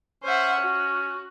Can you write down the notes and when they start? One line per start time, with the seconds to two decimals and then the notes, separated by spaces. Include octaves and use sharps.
0.24 C#4 C5 E5 F#5
0.61 F#4